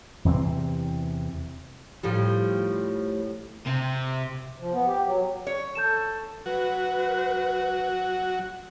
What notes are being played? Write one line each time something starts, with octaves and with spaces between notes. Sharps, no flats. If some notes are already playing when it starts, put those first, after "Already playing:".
E2 C3 E3 C4
A2 F3 G3
C3
F3
B3
G4
F#3
C#5
A4 G6 E7
F#3 F#4 B4